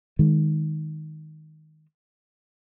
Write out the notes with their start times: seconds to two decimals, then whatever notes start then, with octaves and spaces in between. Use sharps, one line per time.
0.19 D#3 G#3